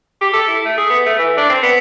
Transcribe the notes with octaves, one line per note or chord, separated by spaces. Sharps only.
G4
A4
E4
A3
G#4
B3
A3
E3
D4
C4
B3